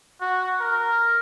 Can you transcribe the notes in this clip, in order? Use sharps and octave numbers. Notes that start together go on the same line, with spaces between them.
F#4
A#4